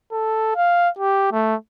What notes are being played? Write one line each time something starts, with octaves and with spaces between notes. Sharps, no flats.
A4
F5
G4
A3